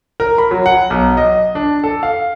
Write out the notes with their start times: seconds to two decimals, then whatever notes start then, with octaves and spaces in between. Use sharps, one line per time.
0.20 A#4
0.38 B5
0.51 F#3
0.66 F#5
0.90 B1
1.17 D#5
1.55 D4
1.84 A4
2.03 F5